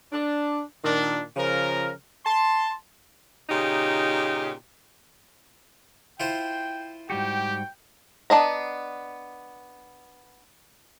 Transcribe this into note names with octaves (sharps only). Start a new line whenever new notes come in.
D4
A#2 D#3 D4
C#3 F3 A#4
A5 C6
A#2 C#3 D#4 G4
E4 F4 C5 G5
G#2 G3 F#4 G4 G5
B3 D4 D#5 A#5